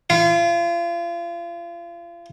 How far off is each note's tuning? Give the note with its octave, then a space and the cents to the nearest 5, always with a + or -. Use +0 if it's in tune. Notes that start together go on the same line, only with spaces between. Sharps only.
F4 -35